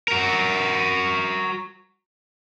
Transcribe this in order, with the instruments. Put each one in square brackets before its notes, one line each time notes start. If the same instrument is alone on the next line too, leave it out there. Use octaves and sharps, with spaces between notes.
[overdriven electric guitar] F#4 A#4